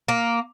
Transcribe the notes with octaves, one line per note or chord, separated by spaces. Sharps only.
A#3